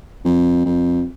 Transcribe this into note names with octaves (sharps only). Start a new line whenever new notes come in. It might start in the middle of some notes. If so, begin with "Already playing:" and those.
F2
F2